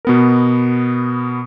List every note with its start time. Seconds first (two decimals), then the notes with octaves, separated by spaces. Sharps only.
0.05 B2 B3 A#4